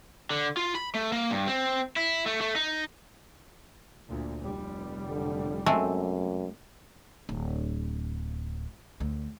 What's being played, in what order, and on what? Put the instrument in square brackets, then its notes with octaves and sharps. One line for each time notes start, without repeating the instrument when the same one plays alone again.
[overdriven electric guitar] D3
F4
B5
A3
A#3
G2
C4
E4
A3
A3
D#4
[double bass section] D2 A#2
F1 G3
[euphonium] D3
[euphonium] F#2 [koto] G#3 A3 C4
[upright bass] D1
D2